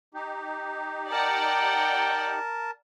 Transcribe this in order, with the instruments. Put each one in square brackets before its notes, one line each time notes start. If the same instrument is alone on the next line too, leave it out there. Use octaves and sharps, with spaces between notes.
[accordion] D#4 G4
[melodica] A#4 A5 [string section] D5 F#5 A#5 [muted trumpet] G5